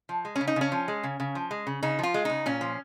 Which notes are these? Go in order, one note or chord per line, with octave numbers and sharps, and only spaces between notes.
F3
G#3
C#4
C#3
D#4
C#3 C#4
F3
G#3
C#3
C#3
F3
G#3
C#3
C#3 D#4
F3 F4
G#3
C#3 D#4
A#2 C#4
F3